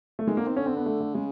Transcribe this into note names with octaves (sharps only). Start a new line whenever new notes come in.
A3
D#3 G#3
D3 A#3
D#3 C4
D3 C#4
C4
B3
A3
A3
C#3 G#3